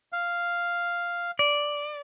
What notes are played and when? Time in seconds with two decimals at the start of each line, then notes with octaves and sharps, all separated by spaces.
0.13 F5
1.39 D5